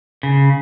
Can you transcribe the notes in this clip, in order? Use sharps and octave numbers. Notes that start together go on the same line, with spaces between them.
C#3